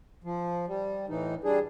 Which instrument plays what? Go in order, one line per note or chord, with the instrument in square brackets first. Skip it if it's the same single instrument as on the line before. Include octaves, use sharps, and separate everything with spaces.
[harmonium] F3
G3
A2 E3 D#4
G3 D4 G#4